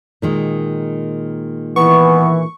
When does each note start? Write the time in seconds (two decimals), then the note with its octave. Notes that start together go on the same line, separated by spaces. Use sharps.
0.22 A#2 D#3 G#3
1.76 E3 B3 C#6